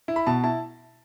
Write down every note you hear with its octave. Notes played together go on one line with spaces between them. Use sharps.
E4
B5
B2 A5
E4 A5